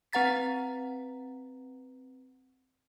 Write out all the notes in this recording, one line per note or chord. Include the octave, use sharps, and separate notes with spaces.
C4 B4 F#5 A#5 A6 B6